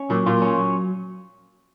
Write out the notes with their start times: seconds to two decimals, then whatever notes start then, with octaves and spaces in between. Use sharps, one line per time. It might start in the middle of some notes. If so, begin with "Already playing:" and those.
Already playing: C#4
0.10 A#2 F#3
0.26 A#2 F4
0.42 C#4
0.58 F#3